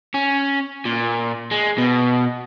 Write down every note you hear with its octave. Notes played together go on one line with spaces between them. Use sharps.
C#4
A#2
G#3
B2